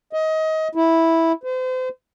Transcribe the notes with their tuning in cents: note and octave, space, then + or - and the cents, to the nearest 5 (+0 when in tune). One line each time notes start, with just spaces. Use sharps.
D#5 +25
E4 -5
C5 -35